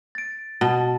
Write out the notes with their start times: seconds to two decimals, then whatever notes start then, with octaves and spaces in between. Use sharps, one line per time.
0.15 A6 D7
0.61 B2 A5